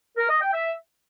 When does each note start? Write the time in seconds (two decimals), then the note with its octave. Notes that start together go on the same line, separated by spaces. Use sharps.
0.17 A#4
0.29 D#5
0.41 G5
0.53 E5